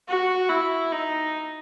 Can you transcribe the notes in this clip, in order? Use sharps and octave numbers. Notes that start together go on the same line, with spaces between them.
F#4
E4
D#4